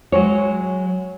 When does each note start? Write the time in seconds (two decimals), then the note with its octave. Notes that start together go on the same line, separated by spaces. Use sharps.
0.12 F#3 G#3 C#5